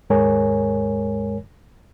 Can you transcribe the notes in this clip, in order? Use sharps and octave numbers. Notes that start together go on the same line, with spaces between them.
D#2 G#2 G#3 A#4 C#5 G#5